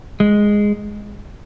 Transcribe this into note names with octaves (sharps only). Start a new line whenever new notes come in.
G#3